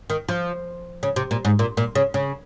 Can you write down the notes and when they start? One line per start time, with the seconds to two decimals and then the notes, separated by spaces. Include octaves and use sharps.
0.10 D#3
0.29 F3
1.03 C#3
1.16 C3
1.31 A#2
1.45 G#2
1.59 A#2
1.77 A#2
1.95 C#3
2.14 C#3